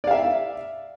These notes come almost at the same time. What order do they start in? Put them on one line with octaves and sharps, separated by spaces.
D5 F5 E5